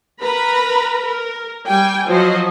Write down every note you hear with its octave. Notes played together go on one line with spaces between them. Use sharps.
A#4 B4 A#5 B5
A#4
G3 G5 G#5
F3 F#3 F#4 C5 D#5